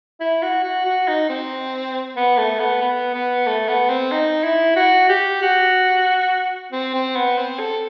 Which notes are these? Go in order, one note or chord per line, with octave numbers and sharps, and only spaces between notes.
E4
F#4
F#4
F#4
D#4
C4
B3
A3
B3
B3
B3
A3
B3
C4
D#4
E4
F#4
G4
F#4
C4
C4
B3
C4
A4